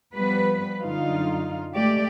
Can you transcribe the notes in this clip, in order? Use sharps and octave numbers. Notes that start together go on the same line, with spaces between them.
F3 G3 B3 B4
F#2 D3 D#4 F4 F5
G#3 A3 G4 D5